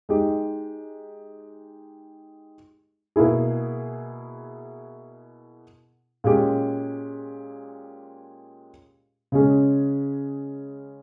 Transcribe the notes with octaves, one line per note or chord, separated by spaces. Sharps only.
G#3 D#4 G4
B2 A#3 E4 G#4
A#2 G#3 C#4 G4
C#3 G#3 C#4 G#4